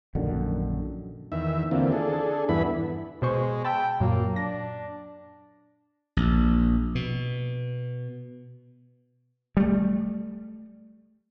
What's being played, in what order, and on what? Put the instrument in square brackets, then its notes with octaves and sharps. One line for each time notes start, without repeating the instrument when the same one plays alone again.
[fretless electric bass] A#1 F#2 D3 D#3
[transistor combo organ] E2 D#3 E5
D3 E3 A#3 C4 F4
D4 G#4 A4
E2 G2 E3 B3 E4 B5
[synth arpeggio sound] B2 C5 C#6 [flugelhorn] G#3
[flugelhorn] G5 [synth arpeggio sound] A5 B5 E6
[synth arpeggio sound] F#2 A#2 F#3 [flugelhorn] A#3
[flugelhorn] D4 [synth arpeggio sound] A#6
[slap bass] A#1
B2
G3 A3